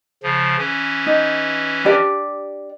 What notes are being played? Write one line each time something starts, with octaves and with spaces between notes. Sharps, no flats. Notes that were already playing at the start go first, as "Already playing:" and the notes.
C#3 F3
E3 C#4
D#4
D4 G4 D5